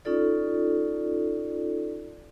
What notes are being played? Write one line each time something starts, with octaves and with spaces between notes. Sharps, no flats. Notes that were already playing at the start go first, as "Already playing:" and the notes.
C#4 D#4 F4 A4 D5